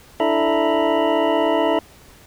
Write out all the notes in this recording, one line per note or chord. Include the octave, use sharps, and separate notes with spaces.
D4 E4 A4 E5 A#5 B5